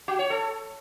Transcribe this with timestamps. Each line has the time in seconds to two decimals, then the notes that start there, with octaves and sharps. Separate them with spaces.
0.08 F#4
0.19 C#5
0.30 A4